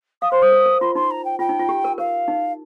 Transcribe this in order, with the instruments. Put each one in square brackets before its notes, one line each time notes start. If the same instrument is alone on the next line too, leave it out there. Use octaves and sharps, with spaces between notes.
[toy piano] F5 [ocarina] D#6
[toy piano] C5 [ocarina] C6
[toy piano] C5 [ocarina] D#6
[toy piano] A#4
A#4
[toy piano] F4 [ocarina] C6
[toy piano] D#4 [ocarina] C6
[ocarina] A#5
G5
[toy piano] F4 [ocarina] G5
[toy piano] D#4
F4
G4
A#4
[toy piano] A#4 [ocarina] F5
[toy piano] D#4